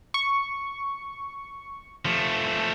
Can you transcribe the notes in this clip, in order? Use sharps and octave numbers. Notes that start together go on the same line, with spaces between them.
C#6
F3 A3